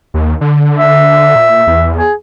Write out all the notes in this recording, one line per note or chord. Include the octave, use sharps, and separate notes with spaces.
D#2
D3
E5
A#2
E2
G#4